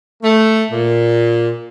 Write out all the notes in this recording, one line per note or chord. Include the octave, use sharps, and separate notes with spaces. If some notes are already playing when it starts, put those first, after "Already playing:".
A3
A#2